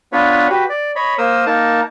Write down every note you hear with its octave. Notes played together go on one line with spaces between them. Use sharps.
B3 D4 F4 B4 C#5
F#4 G4 B4
D5
C#5 D#5 B5
A#3 A#4 C5 D#6 E6
A#3 D#4 A#4 A5